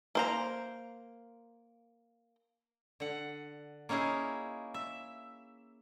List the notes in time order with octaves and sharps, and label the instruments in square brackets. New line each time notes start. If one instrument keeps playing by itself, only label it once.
[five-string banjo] A#3 C5 A#5
[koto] D3 F#5
A#3 C#4 D#4 E4 G#4
E5